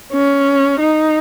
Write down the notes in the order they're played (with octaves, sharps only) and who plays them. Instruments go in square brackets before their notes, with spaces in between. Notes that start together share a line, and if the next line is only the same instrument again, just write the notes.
[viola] C#4
D#4